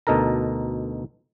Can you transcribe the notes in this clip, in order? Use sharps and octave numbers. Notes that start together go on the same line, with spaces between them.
D2 B2 D#4 A4 A#4 A#5